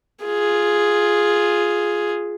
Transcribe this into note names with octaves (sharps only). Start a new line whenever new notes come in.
F4 G#4